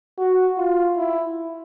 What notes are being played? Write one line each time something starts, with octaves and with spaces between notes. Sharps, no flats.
F#4
F4
E4